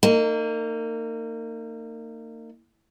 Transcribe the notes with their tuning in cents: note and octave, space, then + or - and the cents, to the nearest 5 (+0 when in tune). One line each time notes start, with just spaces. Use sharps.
A#3 -35 D#4 -20